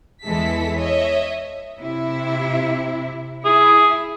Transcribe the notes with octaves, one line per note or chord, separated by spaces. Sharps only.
E2 E3 G#3 E4 A4 B6
C#5 D#5 E5
C3 E4
E4 G#4